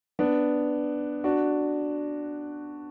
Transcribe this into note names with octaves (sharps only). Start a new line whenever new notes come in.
B3 D4
D4 F#4